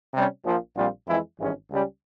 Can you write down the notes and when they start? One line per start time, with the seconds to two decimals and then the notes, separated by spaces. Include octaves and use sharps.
0.13 C3 G3 C#4
0.44 A#1 A#2 F3
0.75 A#1 A#2 G3 C4 F4
1.07 F2 E3 G#3 E4
1.38 G#1 G2 E3 G#3 C#4
1.70 C#2 C#3 G3 C#4